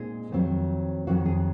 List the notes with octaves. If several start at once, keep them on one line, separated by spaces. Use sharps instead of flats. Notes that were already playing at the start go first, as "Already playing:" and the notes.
Already playing: A#2 G#3 C4 D#4 G#4
F2 D#3 F#3 C4
F2 D#3 F#3 C4 F#4
G#4